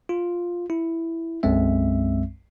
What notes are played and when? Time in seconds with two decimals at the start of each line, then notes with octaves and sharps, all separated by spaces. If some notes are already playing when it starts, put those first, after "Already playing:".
0.09 F4
0.70 E4
1.43 B1 F#2 G#3 C4 E5